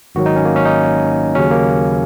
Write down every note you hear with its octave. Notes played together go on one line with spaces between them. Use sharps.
G#1 G#2 D#3 F#3 F#4
D#4
C#4
A#3
C#4
D#4
D#2 C#3 F#3 C#4
A#3